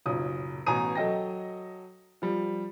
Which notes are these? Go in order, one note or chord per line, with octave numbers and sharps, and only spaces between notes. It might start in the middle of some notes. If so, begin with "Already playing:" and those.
F#1 B1 A#2 D#6
A1 B2 G#5 A#5 D#6 D#7
F#3 A4 D#5 G5 A#6
F3 G3